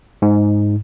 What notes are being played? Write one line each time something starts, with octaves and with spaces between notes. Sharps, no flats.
G#2